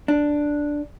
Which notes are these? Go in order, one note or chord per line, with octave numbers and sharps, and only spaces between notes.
D4